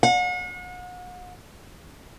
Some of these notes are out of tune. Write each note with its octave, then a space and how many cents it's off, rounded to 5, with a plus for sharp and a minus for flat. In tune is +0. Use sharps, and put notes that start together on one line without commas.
F#5 -40